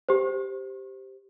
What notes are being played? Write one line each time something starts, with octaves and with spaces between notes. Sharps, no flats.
G4 C5